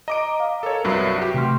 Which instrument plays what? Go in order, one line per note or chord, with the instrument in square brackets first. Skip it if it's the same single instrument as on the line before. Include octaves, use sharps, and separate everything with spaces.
[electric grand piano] D#5 D6 D7 [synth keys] A#5
[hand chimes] F5
[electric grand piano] A4 C#5 [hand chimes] A#4
[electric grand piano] C2 G2 F#3 [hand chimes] B4 E5 C7
[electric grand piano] F#4 G4
[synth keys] C3 E3 F6 [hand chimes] A3 G5 C6